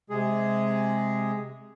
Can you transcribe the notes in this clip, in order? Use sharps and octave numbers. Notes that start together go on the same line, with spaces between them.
C3 G#3 G#4